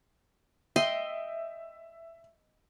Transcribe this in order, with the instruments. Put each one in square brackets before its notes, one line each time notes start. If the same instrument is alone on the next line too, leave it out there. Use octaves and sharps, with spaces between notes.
[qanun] D#5 G5 C6 [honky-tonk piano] E5